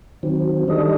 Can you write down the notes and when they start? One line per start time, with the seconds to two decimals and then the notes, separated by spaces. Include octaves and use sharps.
0.23 D#3 F#3 C4
0.68 D#3 G3 D4 A4 D#5